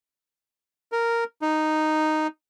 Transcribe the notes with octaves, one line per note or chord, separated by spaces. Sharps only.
A#4
D#4